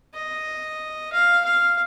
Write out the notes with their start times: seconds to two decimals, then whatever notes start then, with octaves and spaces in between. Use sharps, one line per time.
0.14 D#5
1.12 F5
1.45 F5